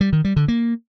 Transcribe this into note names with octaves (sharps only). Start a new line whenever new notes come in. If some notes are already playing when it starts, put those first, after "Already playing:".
G3
D#3
G3
D3
A#3